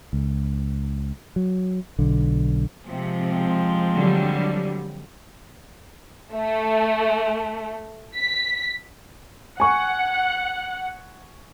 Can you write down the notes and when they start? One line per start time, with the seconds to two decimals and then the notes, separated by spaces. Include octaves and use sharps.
0.13 C#2
1.36 F#3
1.99 B1 D3
2.88 C3 F3 G#3 C4
3.95 D3 F#3 G3
6.35 A3
8.15 B6
9.60 F#5 G#5 C#6